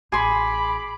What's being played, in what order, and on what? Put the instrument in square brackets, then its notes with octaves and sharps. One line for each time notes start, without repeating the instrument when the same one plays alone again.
[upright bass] A1 [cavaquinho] G#4 C6 [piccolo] B5 [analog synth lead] D6